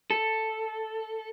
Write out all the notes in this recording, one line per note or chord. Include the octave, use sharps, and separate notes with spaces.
A4